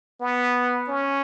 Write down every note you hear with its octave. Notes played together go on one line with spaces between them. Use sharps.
B3
C#4